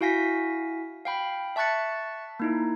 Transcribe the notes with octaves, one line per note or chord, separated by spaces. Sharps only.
E4 F#4 F5 G#5 A#6 B6
F5 G5 B5
E5 A5 C#6 F#6 A6 C#7
A#3 D#4 E4